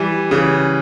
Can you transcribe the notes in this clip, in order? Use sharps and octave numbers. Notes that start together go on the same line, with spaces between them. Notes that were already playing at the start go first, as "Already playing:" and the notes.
Already playing: E3 G3
C#3 E3